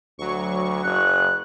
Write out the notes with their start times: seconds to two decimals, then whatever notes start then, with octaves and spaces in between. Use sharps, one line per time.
0.19 D2 F#3 C#6
0.85 F#1 F#6